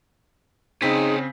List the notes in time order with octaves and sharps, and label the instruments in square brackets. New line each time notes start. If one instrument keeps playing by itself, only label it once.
[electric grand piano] C#3 C4 B6 [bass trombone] D#4 [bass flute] G#4 [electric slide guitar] C#5 G5 G#5